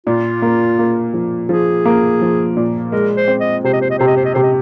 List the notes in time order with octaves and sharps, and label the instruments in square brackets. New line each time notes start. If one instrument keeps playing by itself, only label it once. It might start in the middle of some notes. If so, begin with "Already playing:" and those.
[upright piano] A#2 [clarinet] F4
[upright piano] A#3
A#3
F3
[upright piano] F3 [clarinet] G#4
[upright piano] A#3
F3
A#2
[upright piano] G#3 [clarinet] A#4
[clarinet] C5
[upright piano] C4
[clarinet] D#5
[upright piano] C3 [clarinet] C5
[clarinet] D#5
C5
D#5
[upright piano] C3 [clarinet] C5
[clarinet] D#5
C5
D#5
[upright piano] C3 [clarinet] C5
[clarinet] D#5